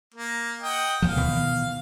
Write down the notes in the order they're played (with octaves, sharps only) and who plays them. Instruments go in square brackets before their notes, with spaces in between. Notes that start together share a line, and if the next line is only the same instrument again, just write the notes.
[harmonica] A#3
D#5 F#5 G5
[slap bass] D#2 F3 [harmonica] F5
[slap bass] B2 D#3 E3